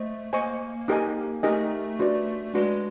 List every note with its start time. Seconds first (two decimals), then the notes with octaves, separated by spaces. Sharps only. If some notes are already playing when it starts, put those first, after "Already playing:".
Already playing: A3 C5 D#5
0.33 A#3 C5 D#5 G#5 C#6
0.88 D#4 G4 A#4 D#5 G#5
1.43 A3 D#4 G4 A#4 D#5 G#5
1.99 D4 F#4 B4 D5
2.54 G#3 D4 F#4 B4 D5